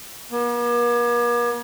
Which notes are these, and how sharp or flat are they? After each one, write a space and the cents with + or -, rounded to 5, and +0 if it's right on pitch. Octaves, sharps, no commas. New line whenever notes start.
A#3 +45